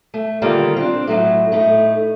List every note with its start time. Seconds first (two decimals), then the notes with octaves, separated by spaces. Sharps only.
0.14 A3
0.42 D3 D#3 G3 A#3 F4
0.76 C4 D4
1.07 A2 F#3 A3
1.52 A2 A3 D#4